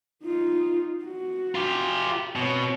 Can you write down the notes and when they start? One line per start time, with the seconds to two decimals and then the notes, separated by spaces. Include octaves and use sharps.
0.24 D#4 F4
1.04 F#4
1.55 F4 G4
2.36 B2 C4 C#5